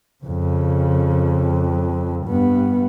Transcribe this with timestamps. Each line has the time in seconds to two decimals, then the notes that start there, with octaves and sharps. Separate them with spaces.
0.24 F2 C#3
2.27 G2 B3